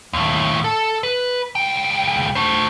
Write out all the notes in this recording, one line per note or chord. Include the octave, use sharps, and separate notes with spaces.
D#2 A2
A4
B4
C#2 G5
A3 C5